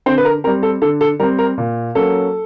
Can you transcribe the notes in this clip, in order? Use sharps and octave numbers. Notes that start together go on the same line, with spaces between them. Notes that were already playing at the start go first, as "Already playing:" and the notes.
D3 C4 C5
B4
A#4
G3 C4 A#4
A4
D3 A4
A4
G3 C4 A#4
A#4
A#2
F#3 A#3 C#4 A4